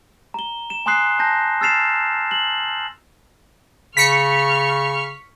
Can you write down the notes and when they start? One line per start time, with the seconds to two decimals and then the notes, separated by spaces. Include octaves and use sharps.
0.34 A#5 G7
0.70 E7
0.86 G#5 A#5 C6 D#6 F#6 C7
1.19 A5 G6 A#6
1.61 E6 F6 A6 C7 E7 F7
2.31 F#7
3.97 C#3 C#6 F6 B6 C#7